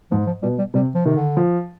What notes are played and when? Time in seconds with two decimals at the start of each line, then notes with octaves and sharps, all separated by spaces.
0.11 G#2 F3
0.27 F3
0.43 B2 G3
0.58 G3
0.74 C3 G3
0.95 F3
1.05 C3 D#3
1.16 D3
1.37 F3